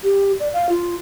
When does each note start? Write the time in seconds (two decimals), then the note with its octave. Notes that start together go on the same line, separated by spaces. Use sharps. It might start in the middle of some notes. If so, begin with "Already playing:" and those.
0.04 G4
0.40 D5
0.53 F5
0.69 F4